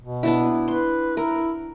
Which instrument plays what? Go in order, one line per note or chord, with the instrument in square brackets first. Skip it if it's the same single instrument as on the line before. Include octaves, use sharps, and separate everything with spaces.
[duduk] B2
[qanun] B3 D4 E4
[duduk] B4 [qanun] C6
[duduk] E4 [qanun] A#4